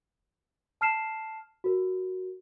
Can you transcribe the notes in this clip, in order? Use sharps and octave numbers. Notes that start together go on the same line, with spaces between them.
A5 F6 C7 E7
F#4 A#4